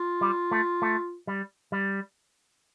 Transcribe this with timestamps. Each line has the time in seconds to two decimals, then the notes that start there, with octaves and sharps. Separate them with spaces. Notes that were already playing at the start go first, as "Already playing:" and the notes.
Already playing: F4
0.21 G3
0.51 A3
0.82 A3
1.27 G3
1.72 G3